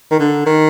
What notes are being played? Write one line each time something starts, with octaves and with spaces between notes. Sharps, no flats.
D#3
D3
D#3